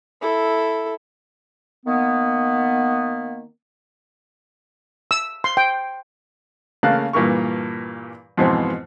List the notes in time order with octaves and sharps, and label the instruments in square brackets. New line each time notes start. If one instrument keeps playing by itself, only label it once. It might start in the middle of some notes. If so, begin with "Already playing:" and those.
[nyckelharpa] E4 A4
[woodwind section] D#3 A#3 B3
[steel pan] E6
C6
G5
[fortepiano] C#3 A3 A#3 F5 F#6
G2 A#2 E3 A#4 C#6
F2 G#2 B2 E3 C4